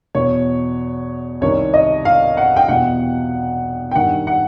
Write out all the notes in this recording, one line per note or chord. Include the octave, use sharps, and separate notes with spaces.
E2 B2 C#5
C2 C3 D#3 C#5
D#5
F5
F#5
G5
E2 B2 F#5
G5
G2 D#3 F#5
F#5